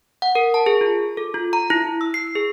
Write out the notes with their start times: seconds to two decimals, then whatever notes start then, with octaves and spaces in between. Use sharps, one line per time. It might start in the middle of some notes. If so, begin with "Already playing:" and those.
0.22 F#5
0.35 A#4
0.54 A5
0.66 G#4
0.81 F4
1.17 A4
1.34 F4
1.53 A#5
1.70 E4
2.01 E6
2.14 C7
2.35 G#4